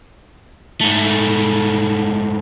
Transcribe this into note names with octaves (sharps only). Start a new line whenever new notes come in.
G#2 A3